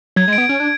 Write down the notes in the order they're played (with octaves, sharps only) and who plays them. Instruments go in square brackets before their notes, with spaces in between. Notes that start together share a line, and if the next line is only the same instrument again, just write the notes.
[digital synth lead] F#3 [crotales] G#6
[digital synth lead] G#3
[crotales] D7
[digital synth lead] B3
C#4
D4